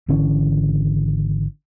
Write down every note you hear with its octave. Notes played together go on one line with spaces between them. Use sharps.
G#1 D3 E3 C#4